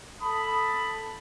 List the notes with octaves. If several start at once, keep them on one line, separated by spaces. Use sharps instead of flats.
A4 A5 B5 D#6